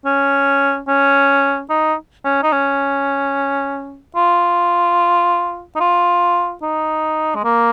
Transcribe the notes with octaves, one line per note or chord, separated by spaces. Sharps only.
C#4
C#4
D#4
C#4
D#4
C#4
F4
D#4
F4
D#4
G#3
A#3